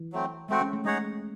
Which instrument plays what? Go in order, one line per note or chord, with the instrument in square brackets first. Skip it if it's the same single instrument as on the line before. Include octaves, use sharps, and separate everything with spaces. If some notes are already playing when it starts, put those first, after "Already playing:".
Already playing: [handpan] E3
[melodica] F#3 A3 C4
[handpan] G#3 [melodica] A3 C4 F#4
[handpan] C#4
A3
[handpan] G#3 [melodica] D#4 G#4 C#5 F#5